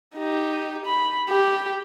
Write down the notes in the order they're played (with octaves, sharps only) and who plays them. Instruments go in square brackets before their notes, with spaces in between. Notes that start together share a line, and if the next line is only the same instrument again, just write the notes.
[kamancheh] D#4 G4
B5
G4